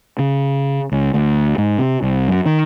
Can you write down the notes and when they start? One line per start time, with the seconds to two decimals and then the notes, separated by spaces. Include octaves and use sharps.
0.19 C#3
0.92 C#2
1.14 D2
1.58 G#2
1.79 C3
2.02 C2
2.28 F#2
2.46 D#3